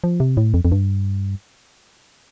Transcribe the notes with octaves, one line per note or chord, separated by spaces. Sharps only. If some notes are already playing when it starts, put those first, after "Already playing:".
F3
C3
A2
F2
F2
G2